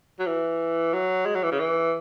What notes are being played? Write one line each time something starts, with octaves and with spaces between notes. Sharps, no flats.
F#3
E3
F#3
G#3
F#3
E3
C#3
E3